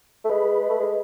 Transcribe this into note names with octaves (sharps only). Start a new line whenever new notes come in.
A3
G#3 B4
G#3
A3
G#3